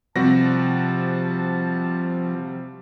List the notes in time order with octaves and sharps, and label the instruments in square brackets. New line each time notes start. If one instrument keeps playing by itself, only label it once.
[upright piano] C3 [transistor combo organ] F3 [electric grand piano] G3 F#4 A#6 [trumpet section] A5